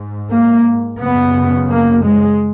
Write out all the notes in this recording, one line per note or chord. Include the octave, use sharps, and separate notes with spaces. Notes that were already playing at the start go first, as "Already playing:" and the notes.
Already playing: G#2
A#3
F#2 C#3 B3
A#3
G#3